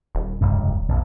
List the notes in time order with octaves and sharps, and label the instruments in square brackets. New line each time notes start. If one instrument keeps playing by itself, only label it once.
[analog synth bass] D#1
[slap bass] F1 C#2 G2
A#1 F2